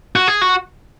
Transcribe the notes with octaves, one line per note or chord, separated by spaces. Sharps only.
F#4
G#4
F#4